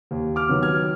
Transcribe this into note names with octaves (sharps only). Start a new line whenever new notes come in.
D#2
D6 F6
D#3 F#3 B3
F6 G#6